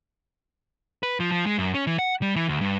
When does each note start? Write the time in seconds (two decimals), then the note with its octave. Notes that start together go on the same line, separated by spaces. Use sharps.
1.03 B4
1.20 F3
1.32 F3
1.46 G#3
1.58 F#2
1.74 C#4
1.87 E3
1.99 F#5
2.22 G3
2.36 E3
2.48 D2
2.61 G2